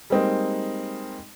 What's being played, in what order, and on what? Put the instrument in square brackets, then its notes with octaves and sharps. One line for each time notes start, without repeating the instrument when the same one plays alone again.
[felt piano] G3 G#3 A#3 C4 D#4